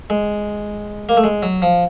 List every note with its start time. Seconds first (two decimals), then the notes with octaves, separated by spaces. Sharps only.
0.10 G#3
1.09 A#3
1.17 A3
1.24 G#3
1.43 F#3
1.62 F3